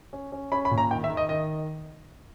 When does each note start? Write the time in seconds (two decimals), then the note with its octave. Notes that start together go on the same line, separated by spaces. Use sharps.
0.13 C#4
0.32 C#4
0.52 C#4 B5
0.65 B5
0.71 A#2
0.78 A#5
0.91 D#3 G5
1.04 E5
1.10 D#3
1.17 D#5
1.29 D#3 D#5